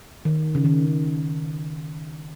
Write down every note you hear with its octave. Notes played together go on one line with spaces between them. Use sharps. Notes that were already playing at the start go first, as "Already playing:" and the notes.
D#3
C#3
D#3
C#3